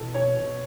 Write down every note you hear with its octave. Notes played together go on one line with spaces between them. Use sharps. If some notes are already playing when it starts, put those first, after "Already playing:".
Already playing: B2 E3 A4
B2 C#5
B2